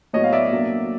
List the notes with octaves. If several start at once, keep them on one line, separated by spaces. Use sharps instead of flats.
A2 F#3 B3 C#5 D#5
F5
D5 E5
B2 F#3 A#3 D4